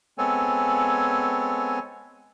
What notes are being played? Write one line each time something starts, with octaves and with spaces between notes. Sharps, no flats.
G#3 B3 C4 A4 C#5 G#5